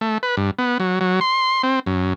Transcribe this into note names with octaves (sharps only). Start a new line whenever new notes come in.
A3
B4
G2
B3
F#3
F#3
C6
C4
F#2